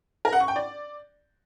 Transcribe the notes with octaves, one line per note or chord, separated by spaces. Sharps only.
A#4
F#5
C#6
G5
D5